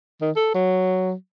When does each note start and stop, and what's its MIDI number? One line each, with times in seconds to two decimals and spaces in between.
0.21 0.31 51
0.36 0.52 69
0.54 1.13 54